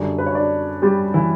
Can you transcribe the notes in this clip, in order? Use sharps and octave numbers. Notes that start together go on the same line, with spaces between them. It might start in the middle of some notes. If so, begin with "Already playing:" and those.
Already playing: F#2 D3 G3 D4 D5
B4
C#5
D4 D5
G3 G4
E3 E4